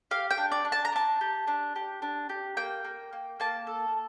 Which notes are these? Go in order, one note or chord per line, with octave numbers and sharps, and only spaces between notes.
G4 F5
G5
D4
D5
D4
A5
A#5
D4 A5
G4
D4
G4
D4
G4
A#3 G5
A#3
A#3
A#3 A5
A4